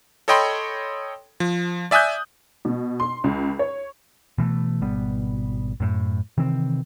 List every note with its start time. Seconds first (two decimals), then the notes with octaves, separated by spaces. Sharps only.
0.28 A4 C#5 D#5 G5 B5 C6
1.40 F3
1.91 D5 E5 G#5 D#6 F#6 G6
2.65 B2
3.00 C6
3.24 C#2
3.59 C#5
4.38 B2 E3 G#3 A3
4.81 G#1 B2 G3 B3
5.80 F#2 A2
6.38 C3 D#3 E3 C4